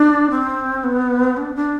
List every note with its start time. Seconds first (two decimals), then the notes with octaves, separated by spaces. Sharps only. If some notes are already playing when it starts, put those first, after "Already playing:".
Already playing: D4
0.31 C4
0.84 B3
1.37 D4
1.56 D4